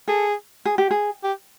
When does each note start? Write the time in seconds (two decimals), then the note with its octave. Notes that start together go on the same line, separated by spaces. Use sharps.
0.08 G#4 A4
0.65 G#4
0.78 G4
0.91 G#4
1.24 G4